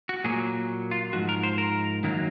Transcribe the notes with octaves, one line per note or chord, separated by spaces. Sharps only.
F#4
A#2 F#3 A#3 G#4
F4
G#2 F3 F#4
A#4
C5
A#4
F#2 D#3 F#3 A#3